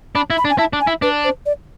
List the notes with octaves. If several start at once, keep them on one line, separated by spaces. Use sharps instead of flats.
D4 B5
E4
B5
D4
G#5
E4 A5
D4
G#5
E4
D4 B4
C5
D5